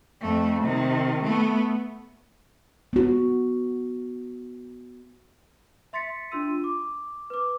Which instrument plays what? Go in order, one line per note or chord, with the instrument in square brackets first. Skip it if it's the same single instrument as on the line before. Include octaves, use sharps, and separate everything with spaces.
[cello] F2 A3
C3 D#3
A3 B3
[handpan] B3 F#4
[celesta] E5 C6 A6 B6 C#7
D4 F4 C6 E6 D#7
D6
B4 D6